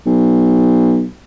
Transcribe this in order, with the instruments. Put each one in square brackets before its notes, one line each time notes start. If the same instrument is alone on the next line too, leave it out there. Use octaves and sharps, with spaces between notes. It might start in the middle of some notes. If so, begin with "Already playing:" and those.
[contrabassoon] B1